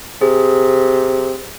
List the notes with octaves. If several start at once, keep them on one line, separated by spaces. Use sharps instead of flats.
C3 G#4